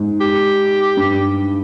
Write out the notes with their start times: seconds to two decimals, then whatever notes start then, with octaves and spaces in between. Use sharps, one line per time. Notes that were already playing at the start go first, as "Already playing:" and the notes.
Already playing: G#2
0.21 G4
0.97 G2